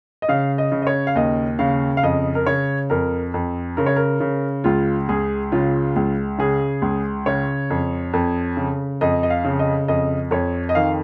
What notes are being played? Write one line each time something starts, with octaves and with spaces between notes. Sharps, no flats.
D#5
C#3 F5
D#5
C#3
D#5
C#5
F5
D#2 D#5
C#3 F5
F5
F2 D#5
A#4
C#3 C#5
F2 A#4
F2
C#3 A#4
C#5
A#4
C#3
C#2 F4
C#2 G#4
C#3 F4
C#2
C#3 G#4
C#2
C#3 C#5
F2
F2
C#3
F2 D#5
D#5
F5
C#3
D#5
F2 D#5
F2 C#5
D#5
D#3 F5